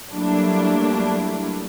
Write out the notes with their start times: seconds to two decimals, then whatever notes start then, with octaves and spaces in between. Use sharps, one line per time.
0.12 F#3 G3 A3 A#3 D4 E4